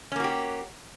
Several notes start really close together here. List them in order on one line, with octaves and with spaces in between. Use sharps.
C#4 A#3 F#4 G4